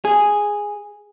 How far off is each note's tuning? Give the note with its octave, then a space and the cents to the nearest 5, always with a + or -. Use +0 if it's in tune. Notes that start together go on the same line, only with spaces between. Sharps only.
G#4 -5